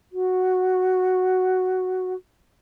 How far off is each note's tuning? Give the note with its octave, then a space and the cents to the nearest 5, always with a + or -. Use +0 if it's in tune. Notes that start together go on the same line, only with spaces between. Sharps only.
F#4 +0